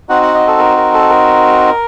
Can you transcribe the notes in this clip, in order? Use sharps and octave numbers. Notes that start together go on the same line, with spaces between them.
C4 D#4 F#4 F#5
F#5
D#5
A4
A#4
A#4
A4
A#4